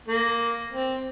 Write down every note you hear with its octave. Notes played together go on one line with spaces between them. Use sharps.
A#3
C4